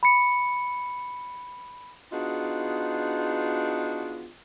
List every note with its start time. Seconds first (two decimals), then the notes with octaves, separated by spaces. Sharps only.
0.03 B5 C#7
2.12 B3 D4 D#4 F4 F#4 G#4